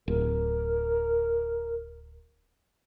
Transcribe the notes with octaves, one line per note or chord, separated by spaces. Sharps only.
D1 A#4